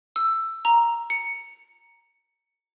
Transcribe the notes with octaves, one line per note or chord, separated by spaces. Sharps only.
E6
A#5
C#7